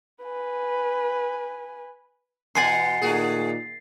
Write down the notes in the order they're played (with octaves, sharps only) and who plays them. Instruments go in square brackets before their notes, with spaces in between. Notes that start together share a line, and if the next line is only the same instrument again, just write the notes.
[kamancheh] B4 G#5
[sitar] E2 B2 [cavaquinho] F#5 G#5 C6 [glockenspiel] A6 C7
[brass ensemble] A#2 D#3 [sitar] A3 F#4 G#4